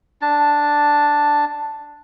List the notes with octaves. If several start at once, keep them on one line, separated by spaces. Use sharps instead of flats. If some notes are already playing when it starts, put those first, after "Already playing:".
D4 A5